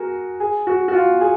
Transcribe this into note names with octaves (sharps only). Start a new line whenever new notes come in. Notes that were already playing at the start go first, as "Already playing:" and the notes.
Already playing: F#4 G#4 A#4
G#4
F#4
F#4
F4
G#4